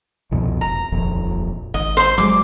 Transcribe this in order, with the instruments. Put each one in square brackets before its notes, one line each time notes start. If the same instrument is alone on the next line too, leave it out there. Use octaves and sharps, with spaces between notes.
[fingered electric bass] C2 F2 B2
[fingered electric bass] F1 [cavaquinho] A#5
[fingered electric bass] D#1 A#1 F2
[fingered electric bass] G#1 [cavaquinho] D#5
[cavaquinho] C5 C6
[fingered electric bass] F#3 G#3 [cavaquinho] D6